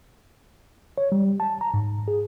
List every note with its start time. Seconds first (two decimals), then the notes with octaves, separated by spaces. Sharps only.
0.98 C#5
1.12 G3
1.40 A5
1.61 A#5
1.74 G#2
2.08 G#4